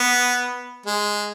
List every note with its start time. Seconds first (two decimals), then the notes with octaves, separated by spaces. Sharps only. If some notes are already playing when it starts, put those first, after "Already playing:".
Already playing: B3
0.86 G#3